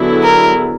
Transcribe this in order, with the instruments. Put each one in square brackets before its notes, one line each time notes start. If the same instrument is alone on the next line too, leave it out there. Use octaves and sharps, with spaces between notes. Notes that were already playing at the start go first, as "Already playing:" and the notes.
Already playing: [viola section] D3 F#3 B3 E4 G#4
[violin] A#4